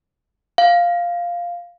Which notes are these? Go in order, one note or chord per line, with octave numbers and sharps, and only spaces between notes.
F5